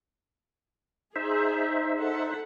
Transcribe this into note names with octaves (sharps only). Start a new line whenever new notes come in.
D#4 G#4 C5 E5
A4 F#5